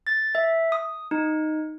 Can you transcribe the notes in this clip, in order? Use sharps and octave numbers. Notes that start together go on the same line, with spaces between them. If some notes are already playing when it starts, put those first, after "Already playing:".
A6
E5
D#6
D#4